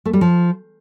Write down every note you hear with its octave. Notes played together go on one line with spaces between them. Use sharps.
A3
G3
F3